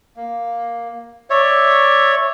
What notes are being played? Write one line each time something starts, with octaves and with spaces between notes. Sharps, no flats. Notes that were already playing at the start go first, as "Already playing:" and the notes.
A#3
C#5 D5 E5